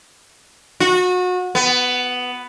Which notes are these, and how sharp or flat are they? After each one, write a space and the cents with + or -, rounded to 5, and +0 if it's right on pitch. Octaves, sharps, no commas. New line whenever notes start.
F#4 -30
B3 +10